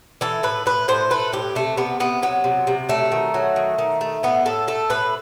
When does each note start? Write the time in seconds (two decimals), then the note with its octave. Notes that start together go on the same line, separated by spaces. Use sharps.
0.21 E3 A4
0.43 A2 B4
0.66 A2 B4
0.88 A2 C5
1.10 A3 B4
1.33 A2 G4
1.55 C3 A3
1.77 C3 B3
2.00 C3 B3
2.22 F#3 B3
2.44 C3
2.67 C3
2.89 F#3 A3
3.12 D#3
3.34 F#3
3.56 D#3
3.78 D#3
4.01 A3
4.23 A2 B3
4.45 A2 A4
4.68 A3 A4
4.90 A2 B4